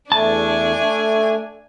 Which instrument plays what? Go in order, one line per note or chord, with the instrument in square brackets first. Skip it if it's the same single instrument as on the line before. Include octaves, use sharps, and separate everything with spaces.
[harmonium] E2 A3 [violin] D4 G#5 [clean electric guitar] A5
[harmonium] A3